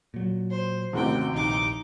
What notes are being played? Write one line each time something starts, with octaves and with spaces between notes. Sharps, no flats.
A#2 F#3
C5
A1 D#2 C3 D#3 E3 C#4 F#4 G5
A#1 D#4 D6